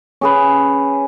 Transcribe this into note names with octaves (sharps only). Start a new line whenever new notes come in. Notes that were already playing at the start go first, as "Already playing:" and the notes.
C#4 G#4 B4